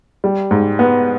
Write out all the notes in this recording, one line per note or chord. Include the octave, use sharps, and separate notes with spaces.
G3
G#2
B3